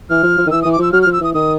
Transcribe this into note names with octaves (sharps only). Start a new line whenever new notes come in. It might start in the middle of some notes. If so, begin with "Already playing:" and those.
E3 F6
F3
F3
D#3
E3 E6
E3 D#6
D6
F3 E6
F#3 F6
F3 F6
E6
E3 D#6
D#3 D#6